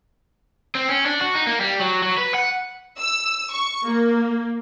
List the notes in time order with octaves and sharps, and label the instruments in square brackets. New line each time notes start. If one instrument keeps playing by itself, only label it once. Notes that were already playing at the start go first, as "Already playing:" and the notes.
[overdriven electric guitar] C4
C#4
D4
F#4
D#4
A#3
G3
F#3
F#3
B4
F#5
[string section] E6
C#6
A#3